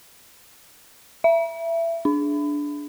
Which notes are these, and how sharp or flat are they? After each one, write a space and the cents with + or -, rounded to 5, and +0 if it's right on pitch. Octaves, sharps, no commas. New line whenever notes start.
E5 +20
D4 -5